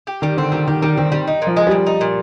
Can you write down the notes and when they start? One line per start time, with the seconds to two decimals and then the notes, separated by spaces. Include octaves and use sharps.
0.07 G4
0.22 D#3 G3
0.37 D3 C4
0.52 D#3 G3
0.67 D#3 G4
0.82 D#3 G3
0.97 D#3 C4
1.11 D#3 G3
1.27 D#4
1.42 A#2 F3
1.57 G#3
1.67 A#2 G3
1.86 D#4
2.01 A#2